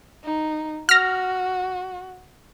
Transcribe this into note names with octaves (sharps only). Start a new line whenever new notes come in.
D#4
F#4 F6 A#6